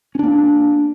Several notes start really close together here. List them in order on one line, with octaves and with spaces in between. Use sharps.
C#4 D4 A#3